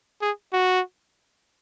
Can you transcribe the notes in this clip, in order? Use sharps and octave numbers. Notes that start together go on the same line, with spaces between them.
G#4
F#4